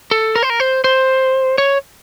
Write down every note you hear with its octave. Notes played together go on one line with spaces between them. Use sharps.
A4
A#4
C5
A#4
C5
C5
C#5